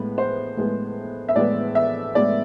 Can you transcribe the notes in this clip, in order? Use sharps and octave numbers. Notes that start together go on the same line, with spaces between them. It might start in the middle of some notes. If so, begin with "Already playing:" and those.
Already playing: A2 G#3 B3 B4
C5
A2 G#3 B3
E5
A2 G#3 B3 D5
E5
A2 G#3 B3 D5